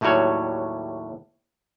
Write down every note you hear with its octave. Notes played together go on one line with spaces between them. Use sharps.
D#2 A2 F#3 G3 F#4 C#5